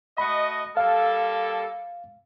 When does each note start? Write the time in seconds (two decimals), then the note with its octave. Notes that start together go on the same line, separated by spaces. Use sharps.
0.18 A3 F#4 D#5 B5
0.77 G3 A#3 A4 F5